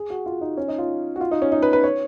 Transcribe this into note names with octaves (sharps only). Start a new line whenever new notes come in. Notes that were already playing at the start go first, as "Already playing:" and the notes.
Already playing: G#4
F#4
F4
D#4
C#4
D#4
F4
F#4
F4
D#4
C#4
D#4
B4
B4
C#5